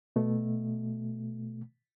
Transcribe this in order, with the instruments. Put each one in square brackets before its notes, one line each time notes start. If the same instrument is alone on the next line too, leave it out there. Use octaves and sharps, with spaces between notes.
[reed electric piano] B2 A3